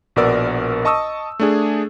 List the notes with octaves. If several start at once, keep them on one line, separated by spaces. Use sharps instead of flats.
A#1 B2 B3 A#4 D5 E6
D#5 A5 C#6 D#6 E6
A3 D4 G#4